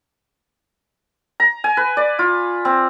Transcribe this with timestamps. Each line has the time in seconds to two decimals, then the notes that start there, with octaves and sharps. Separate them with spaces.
1.40 A#5
1.64 G#5
1.77 B4
1.97 D5
2.19 F4
2.65 C4